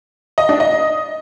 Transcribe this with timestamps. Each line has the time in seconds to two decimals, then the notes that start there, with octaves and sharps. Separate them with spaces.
0.38 D#5
0.49 D4
0.60 D#5